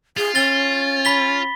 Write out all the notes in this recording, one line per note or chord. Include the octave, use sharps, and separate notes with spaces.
F4 G#4
C#4 A6 G7
B5 B6 G7